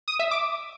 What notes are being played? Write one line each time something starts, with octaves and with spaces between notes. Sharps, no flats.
D#6
E5
D6